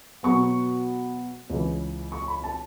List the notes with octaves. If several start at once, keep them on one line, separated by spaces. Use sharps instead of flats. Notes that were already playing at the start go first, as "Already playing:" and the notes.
B2 F#3 B3 C#6
C#2 C#3 E3
C#6
B5
A5